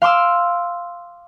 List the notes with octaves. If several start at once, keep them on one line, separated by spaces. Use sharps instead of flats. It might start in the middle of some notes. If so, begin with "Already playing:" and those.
F5 C6 D6 E6